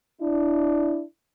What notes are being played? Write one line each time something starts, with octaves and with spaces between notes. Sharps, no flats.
D4 E4